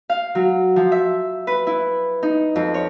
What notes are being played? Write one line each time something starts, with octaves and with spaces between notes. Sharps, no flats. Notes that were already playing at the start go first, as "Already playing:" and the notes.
F5
F#3
F3
E5
B4
E4
D#4
F2
C#5